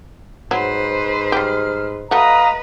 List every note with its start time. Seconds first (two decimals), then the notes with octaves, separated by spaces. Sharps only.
0.51 G#2 F#3 B4 C5
1.32 G3 G4 F6
2.11 A3 F#4 B4 D#5 F5 A#5 D#6